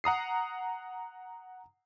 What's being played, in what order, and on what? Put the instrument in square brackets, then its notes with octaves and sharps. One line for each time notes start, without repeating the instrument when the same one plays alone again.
[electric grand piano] F#5 A#5 D#6 C7